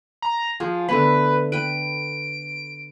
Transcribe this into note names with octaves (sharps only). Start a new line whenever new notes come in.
A#5
F3 G#4
D3 A3 B3 B4
B4 G5 D7